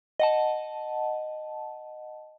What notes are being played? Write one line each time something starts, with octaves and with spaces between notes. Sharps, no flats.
D#5 F#5 A5